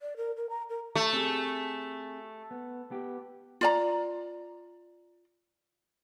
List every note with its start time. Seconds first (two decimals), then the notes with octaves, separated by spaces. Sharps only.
0.02 D5
0.17 A#4
0.37 A#4
0.50 A#5
0.69 A#4
0.95 A3
1.13 C4 G4 G#4
2.51 B3
2.91 B3 G4
3.61 F4 D5 A#5